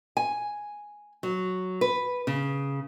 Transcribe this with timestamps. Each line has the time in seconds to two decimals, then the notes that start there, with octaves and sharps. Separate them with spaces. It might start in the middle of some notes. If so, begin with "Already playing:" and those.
0.17 G#5
1.23 F#3
1.81 B4
2.27 C#3